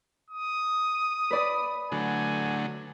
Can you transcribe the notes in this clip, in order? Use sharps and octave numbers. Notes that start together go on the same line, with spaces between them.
D#6
B4 D5 B5
D3 F#3 A3 G#5